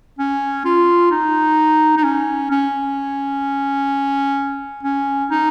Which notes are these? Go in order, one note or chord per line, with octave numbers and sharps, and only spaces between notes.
C#4
F4
D#4
D#4
C#4
C#4
C#4
D#4